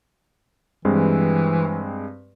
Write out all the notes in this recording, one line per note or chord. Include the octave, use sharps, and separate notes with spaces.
G2 E3 G#3 C4